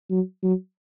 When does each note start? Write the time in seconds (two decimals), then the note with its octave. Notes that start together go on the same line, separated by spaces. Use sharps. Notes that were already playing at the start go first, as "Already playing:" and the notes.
0.10 F#3
0.43 F#3